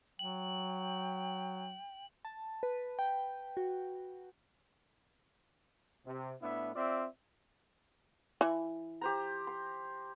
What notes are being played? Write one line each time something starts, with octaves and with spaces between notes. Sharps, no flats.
F#3 G5 F#7
A5
B4
G5
F#4
C3
A2 B3 D4 E4 E5
C4 F4 D5 E5
E3
G4 C5 A#5
C6